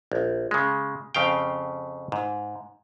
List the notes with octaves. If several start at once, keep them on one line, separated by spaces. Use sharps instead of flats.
A#1
C#3 G#3
F2 C#3 F5 G5
G#2